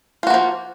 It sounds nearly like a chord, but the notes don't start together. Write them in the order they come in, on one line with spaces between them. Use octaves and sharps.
F4 F#4 A#3 F3